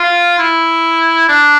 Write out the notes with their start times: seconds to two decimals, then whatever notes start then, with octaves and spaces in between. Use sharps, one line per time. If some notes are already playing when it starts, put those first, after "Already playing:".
Already playing: F4
0.39 E4
1.29 D4